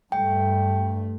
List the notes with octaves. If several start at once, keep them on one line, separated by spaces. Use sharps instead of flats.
G2 A3 G5